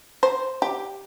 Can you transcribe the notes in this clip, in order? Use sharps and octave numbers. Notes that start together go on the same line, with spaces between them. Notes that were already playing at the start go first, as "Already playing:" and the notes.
C5
G4